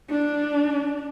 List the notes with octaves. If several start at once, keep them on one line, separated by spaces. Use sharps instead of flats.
D4